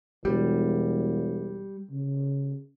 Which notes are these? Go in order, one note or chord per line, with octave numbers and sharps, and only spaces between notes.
E1 G3
C#3